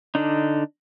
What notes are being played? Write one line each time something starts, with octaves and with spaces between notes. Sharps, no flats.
D3 D4 D#4